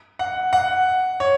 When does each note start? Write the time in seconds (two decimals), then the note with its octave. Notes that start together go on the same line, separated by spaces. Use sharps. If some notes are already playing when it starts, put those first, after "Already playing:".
0.19 F#5
0.53 F#5
1.20 C#5